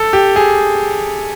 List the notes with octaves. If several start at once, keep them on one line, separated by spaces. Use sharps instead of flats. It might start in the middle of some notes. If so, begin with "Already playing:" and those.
Already playing: A4
G4
G#4